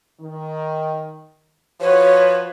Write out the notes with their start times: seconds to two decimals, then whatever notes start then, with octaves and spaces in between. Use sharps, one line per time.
0.20 D#3
1.81 F3 F#4 B4 C#5